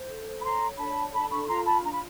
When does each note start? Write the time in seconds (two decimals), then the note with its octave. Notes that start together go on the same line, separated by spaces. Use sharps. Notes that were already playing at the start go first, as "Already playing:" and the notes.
Already playing: C5
0.09 A4
0.39 B5
0.43 C#5 A#5 C6
0.78 D4 A5 B5
1.13 A4 A5 B5
1.31 B5 C#6
1.44 C#6
1.48 F4 A#5 C6
1.65 A5 B5
1.83 D4 A#5
1.92 B5